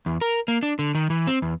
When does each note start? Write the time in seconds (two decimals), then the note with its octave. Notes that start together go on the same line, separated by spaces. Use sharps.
0.06 E2
0.21 A#4
0.48 A#3
0.63 D4
0.79 D3
0.95 D#3
1.10 E3
1.27 C4
1.42 E2